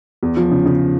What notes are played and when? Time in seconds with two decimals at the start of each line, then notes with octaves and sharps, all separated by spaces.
0.23 E2
0.37 F3
0.51 C#3
0.66 C#3